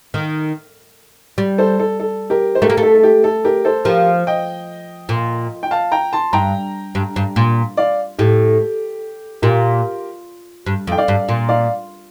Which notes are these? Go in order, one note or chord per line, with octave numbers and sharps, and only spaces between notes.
D#3
G3
A4 C5
A4
A4
G4 A#4
C5
A3 G4 A#4
A#3
A3
A4
A4
G4
A4
G4 A#4
A4 C5
F3 G4 A#4
D#5 G5
A#2
G5
F5 A5
G5 A#5
A5 C6
G2 G5 A#5
G2
G2
A#2
D5 F5
A2 G4
A#2 G4 A#4
G2
F2
G5
D5 F5
G2
A#2
D5 F5